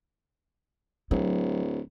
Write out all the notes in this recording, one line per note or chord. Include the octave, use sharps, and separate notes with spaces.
D1 F#3